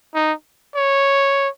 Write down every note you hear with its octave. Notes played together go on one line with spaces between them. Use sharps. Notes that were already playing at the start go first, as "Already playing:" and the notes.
D#4
C#5